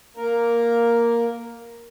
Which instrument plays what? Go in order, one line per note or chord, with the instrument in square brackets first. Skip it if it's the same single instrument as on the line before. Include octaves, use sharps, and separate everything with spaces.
[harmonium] A#3 A#4